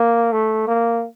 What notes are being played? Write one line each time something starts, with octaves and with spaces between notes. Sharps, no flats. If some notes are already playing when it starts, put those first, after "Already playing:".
Already playing: A#3
A3
A#3